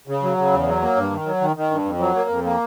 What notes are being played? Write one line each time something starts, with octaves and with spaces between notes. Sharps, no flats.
C#3
F#3
C#3
E2
F#3
A#3
G2
D#3
F#3
D#3
D#3
G2
F2
F#3
A#3
F2
A#3